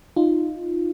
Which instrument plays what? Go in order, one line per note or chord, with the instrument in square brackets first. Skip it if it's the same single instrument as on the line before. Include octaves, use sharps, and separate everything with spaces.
[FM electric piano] D#4 F4